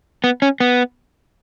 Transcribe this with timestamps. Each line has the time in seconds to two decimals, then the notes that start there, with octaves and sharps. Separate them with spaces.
0.24 B3
0.42 C#4
0.60 B3